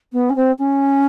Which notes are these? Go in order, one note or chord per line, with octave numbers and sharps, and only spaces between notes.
B3
C#4
C4
C#4